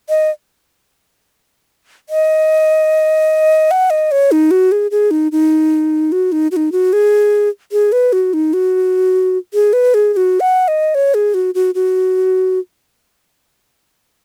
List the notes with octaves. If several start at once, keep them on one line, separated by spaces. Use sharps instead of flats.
D#5
D#5
F#5
D#5
C#5
D#4
F#4
G#4
G#4
D#4
D#4
F#4
D#4
F#4
D#4
F#4
G#4
G#4
B4
F#4
D#4
F#4
G#4
B4
G#4
G#4
F#4
F#5
D#5
C#5
G#4
F#4
F#4
F#4